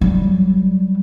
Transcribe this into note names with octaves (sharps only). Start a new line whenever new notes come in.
F#3 G3